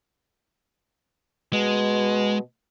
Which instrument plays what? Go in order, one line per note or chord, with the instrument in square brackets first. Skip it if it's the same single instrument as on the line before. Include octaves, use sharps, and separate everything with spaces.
[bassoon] B2 [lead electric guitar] G#3